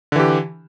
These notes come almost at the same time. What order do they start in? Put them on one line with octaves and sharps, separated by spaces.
D3 E3 G4